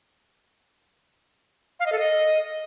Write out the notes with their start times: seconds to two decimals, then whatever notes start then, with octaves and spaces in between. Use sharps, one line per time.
1.80 F5
1.86 D#5
1.92 A4
1.99 D#5